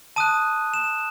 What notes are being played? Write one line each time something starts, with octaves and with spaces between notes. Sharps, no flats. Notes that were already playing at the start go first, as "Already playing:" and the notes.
A5 D#6 F#6 D#7
E7